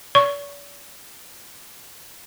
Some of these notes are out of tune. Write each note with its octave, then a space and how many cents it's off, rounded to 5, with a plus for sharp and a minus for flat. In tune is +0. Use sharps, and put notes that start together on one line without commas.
D5 -45 C#6 +0